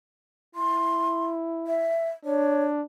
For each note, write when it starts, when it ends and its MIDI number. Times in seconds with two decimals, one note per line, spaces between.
0.55 1.91 64
0.55 1.27 84
1.67 2.09 76
2.25 2.82 62
2.25 2.64 73